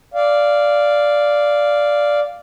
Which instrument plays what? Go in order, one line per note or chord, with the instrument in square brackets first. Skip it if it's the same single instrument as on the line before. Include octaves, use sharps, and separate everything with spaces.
[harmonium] D5 F5